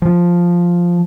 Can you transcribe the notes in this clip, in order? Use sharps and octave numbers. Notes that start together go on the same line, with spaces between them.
F3